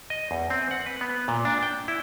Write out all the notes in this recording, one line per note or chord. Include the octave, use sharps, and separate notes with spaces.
D#5
E2
C4
F#5
B4
B3
A#2
D4
G5
E4